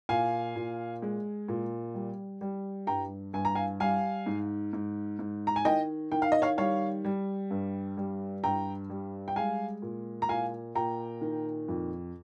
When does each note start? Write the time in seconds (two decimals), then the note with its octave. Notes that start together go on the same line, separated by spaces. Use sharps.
0.09 A#2 F5 G#5
0.56 A#2
1.02 G#3
1.48 A#2
1.94 G3
2.41 G3
2.87 G2 G5 A#5
3.34 G2 G#5
3.45 A#5
3.55 F5 G#5
3.80 G3 F5 G#5
4.26 G#2
4.73 G#2
5.19 G#2
5.47 A#5
5.56 G#5
5.65 D#3 D#5 G5
6.12 D#3 G5
6.22 F5
6.32 D#5
6.42 C#5 F5
6.58 G3 C#5 F5
7.04 G3
7.51 G2
7.97 G3
8.44 G2 G5 A#5
8.90 G3
9.28 G5
9.36 G#3 F5 G#5
9.82 A#2
10.22 A#5
10.29 A#2 F5 G#5
10.75 A#2 G5 A#5
11.21 D#3
11.68 F2